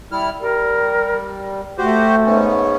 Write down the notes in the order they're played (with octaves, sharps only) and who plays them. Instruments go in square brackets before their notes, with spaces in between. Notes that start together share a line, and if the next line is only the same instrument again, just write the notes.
[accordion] G3 E4 F6
[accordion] G3 [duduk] A#4
[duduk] A3 [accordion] F#4 G4 C5
[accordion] G#2 B3 C#4